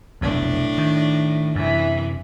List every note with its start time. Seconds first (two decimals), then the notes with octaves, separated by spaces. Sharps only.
0.21 F1 B1 F2 A2 D4
0.78 D#3
1.55 F#2 C3 E3